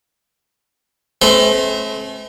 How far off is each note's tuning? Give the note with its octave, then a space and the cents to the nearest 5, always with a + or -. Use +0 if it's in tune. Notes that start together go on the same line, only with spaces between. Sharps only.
A3 -40 C4 +40 C5 -40